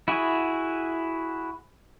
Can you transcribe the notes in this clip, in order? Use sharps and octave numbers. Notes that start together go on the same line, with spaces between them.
E4 F#4 G#4